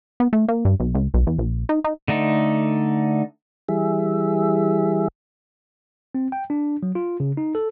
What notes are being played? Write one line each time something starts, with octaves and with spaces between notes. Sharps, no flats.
B3
A3
A#3
G2
B1
C#2
B1
E2
A#1
D#4
D#4
D3 A3 D#4
E3 G3 G#4 E5
C4
G5
D4
F#3
F4
C#3
D#4
A4